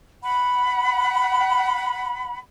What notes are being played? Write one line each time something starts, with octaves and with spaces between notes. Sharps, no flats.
F#5 B5